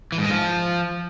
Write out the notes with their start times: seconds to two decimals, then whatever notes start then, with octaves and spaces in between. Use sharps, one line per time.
0.12 E3
0.18 G#2
0.24 G#3
0.30 F3